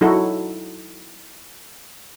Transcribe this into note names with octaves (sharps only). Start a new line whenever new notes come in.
F#3 D#4 E4 F#4 A4